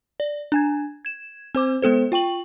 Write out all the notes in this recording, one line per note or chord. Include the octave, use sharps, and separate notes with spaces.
D5
D4 G#5 G#6
G#6 E7
C4 C5 D6
G#3 B3 A4 C5
F4 G5 C#6 F#7